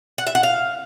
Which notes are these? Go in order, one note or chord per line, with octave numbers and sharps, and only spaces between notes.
F#5
E5
F#5
F5